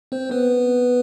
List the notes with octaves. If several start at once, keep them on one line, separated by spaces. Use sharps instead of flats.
C4 C5
B3 B4